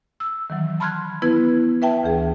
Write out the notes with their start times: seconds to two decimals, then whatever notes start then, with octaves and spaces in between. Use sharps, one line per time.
0.20 E6
0.50 D#3 E3 F#3
0.80 A5 B5 C6 F6 F#6 G#6
1.22 B3 E4 B4 G#6
1.82 B4 E5 G5 A5
2.03 D2 E3 G#4